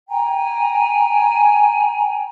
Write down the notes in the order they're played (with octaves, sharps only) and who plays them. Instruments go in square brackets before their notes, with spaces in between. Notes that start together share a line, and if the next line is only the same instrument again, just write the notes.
[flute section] G5 G#5 A#5